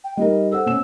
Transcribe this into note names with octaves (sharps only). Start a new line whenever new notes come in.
G5
G3 D#4 A#4 D#5
A4 C5 F#5 E6
B2 C#4 E7